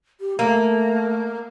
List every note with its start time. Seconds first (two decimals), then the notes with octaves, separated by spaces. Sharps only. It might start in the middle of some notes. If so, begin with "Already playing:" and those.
0.20 G4
0.39 A3 A#3